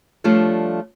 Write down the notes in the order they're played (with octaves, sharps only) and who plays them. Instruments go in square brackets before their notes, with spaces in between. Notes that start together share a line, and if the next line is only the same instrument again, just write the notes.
[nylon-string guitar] F3 G3 A3 D4 F4 C#5